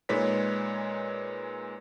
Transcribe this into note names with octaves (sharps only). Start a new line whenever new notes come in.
A#2 G#3 D#4 B4 C#5 B6